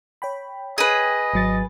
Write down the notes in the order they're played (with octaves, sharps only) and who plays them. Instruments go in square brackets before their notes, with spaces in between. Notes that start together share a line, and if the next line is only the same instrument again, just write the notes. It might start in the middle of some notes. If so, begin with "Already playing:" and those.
[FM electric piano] C#5 G5 B5
[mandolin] G#4 B4 [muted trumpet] D#5
[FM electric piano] G#1 F#3 A6